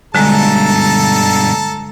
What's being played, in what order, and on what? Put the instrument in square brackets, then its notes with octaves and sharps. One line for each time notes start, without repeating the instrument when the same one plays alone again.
[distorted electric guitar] G2 B2 [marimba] D3 G#3 [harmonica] A4 A5 A#5